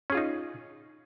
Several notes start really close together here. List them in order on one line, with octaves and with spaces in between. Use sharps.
C#4 G#4 F4 D#4